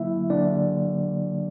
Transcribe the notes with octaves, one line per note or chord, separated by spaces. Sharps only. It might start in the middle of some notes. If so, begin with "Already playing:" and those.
Already playing: D3 F#3 A#3 E4 E5
D3 F#3 A#3 D4 D5